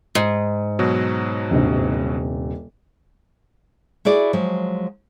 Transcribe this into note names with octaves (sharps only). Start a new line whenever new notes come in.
G#2
B2 F#3
D#1 G2 C3
E4 F#4 G#4 D5
F3 F#3 G#3